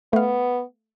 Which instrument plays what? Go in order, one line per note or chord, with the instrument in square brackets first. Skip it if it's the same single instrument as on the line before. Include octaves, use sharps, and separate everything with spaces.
[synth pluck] A3 F5 [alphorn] B3